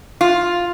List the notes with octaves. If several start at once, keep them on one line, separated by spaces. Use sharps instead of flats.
F4